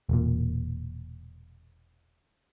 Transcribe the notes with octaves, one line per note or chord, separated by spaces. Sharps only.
E1 A#2